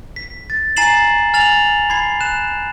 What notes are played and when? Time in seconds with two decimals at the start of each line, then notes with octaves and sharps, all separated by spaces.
0.16 B6
0.50 A6
0.76 G#5 A#5 A6 C7 E7 F#7
1.33 G#5 F6 A6 F7 F#7
1.90 B5 G#6 C7
2.20 F#6 E7